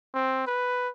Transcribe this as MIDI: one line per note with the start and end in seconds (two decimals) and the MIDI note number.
0.14 0.44 60
0.47 0.89 71